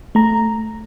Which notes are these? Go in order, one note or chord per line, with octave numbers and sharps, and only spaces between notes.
A3 A#5